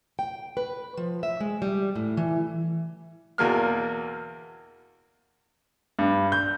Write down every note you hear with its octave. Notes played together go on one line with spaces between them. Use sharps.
G5
B4
F3
E5
G#3
G3
A2
E3
E2 B2 A#3 F6
G2
G6